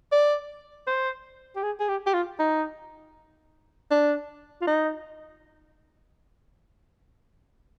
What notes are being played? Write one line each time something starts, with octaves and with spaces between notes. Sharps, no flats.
D5
C5
G4
G#4
G#4
G4
G4
F4
D#4
D4
F4
D#4